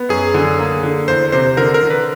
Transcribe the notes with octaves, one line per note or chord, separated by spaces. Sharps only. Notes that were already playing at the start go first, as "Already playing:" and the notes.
Already playing: B3
F#2 G#4
D3
A#3
D3
E2 C5
C3 C5
D3 A#4
A#4
D3
B4